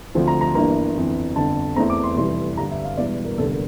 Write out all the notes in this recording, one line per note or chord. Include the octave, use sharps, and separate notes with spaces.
D2 D3 F3 C4
A#5
A#5
G1 G2 E3 A#3 A#5
G1 F2 E3
G1 F2 D3 A5
E2 E3 A3 C4 A#5
D6
C6
F1 F2 E3 G3 C6
G2 D3 G3 A#5
E5
F5
E1 E2 E3 G3 D5
A#4
F1 E2 D3 G3 A4
A#4